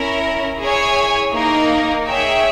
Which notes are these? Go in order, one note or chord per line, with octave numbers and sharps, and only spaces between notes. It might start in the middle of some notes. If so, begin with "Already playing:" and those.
Already playing: C#4 E4 A#4
E4 G#4 C#5 G#5
A#3 D#4 A#4
G#4 C#5 E5 G5